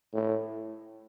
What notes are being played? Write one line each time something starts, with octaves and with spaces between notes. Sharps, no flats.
A2